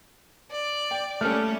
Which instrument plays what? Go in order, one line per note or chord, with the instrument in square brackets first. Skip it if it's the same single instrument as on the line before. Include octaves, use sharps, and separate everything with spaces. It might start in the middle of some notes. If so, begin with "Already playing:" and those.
[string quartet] D5
[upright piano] G5
[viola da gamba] G3 A#3 C#4 [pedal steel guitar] A3 [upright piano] A4 F6